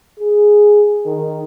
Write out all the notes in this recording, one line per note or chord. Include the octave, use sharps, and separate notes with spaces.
G#4
D#3